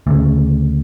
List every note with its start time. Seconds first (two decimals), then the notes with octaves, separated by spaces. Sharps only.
0.07 D2 C#3